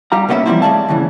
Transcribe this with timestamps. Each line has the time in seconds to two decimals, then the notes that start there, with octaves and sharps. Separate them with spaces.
0.12 G3 G4 F5 A#5
0.28 B2 A#3 B3 C#4 A#4 E5
0.46 E3 F3 G3 A#3 C4 E4
0.62 G#3 A3 D5 E5 F5 A5
0.89 D#2 G#2 C#3 E3